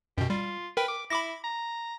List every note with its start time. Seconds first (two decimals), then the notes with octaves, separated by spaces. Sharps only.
0.18 F#2 B2 G4
0.30 G3 F4
0.77 A#4 B4 G5
0.88 D6
1.10 E4 B5 D6 A#6
1.44 A#5